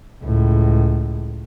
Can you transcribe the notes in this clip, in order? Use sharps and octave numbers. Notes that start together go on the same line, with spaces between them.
C#2 A2